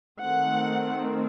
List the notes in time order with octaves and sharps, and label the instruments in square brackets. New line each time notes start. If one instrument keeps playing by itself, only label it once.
[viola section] D#3 A3 C4 F#5